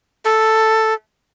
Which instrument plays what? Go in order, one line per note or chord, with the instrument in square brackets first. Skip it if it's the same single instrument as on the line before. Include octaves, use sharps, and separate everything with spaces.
[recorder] A4